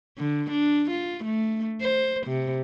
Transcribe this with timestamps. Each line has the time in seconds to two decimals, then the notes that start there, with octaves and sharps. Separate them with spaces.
0.18 D3
0.51 D4
0.91 F4
1.25 A3
1.81 C5
2.27 C3